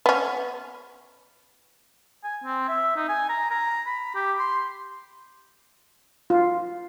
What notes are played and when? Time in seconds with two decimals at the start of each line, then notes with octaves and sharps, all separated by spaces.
0.06 B3 C#4
2.24 G#5
2.44 C4
2.69 E5
2.96 D#4
3.09 G#5
3.29 A#5
3.50 A#5
3.86 B5
4.15 G4
4.39 C6
6.30 F4